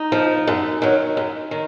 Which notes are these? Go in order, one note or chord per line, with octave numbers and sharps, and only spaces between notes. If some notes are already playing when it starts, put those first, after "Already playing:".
Already playing: D#4
F3
F#2
D#3 F#3
F#2
D#3